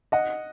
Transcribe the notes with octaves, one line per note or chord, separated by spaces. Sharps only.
D#5 F#5